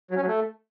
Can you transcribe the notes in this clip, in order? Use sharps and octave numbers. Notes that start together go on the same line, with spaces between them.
F#3
C#4
F#3
A3